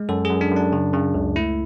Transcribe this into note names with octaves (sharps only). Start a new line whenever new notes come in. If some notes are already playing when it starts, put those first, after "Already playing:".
Already playing: G#3
F#2 A4
F#2 G#4
D4
F#2
D4
C#3
C#3
C#2
A3 E4